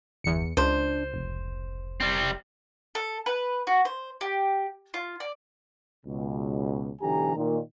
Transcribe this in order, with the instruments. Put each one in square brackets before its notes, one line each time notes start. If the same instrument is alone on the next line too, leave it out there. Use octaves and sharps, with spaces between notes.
[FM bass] G1 [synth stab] E2 C#7
[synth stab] C#2 [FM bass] D4 [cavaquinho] C5
[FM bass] F1
[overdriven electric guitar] G3 C4
[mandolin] A4
B4
F#4
C5
G4
F4
D5
[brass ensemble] C#2 B2
B1 D3 E3 G4 G#5 A#5
A#2 D#3